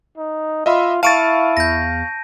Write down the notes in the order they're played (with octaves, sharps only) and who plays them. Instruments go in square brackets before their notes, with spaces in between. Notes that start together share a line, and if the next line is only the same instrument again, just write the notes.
[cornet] D#4
[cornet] F4 [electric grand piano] D#5 E5 B5
[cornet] E4 [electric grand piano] F5 C#6 A6 [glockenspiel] A5 D7 D#7
[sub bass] E2 [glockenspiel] G6 A#6